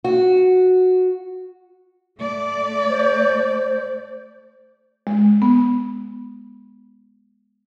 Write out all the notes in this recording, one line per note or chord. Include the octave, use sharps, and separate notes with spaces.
F#4
A3 D5
C5
G#3
B3